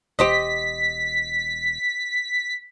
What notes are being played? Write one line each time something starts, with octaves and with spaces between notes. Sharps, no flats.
E1 G4 C5 D#5 B6